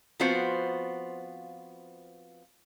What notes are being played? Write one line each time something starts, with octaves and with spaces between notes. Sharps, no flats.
F3 B3 C4 F4 F#4 C5